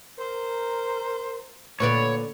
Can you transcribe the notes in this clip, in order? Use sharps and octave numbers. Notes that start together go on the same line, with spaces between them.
A#4 C5
A#2 D3 B4 C#5 D5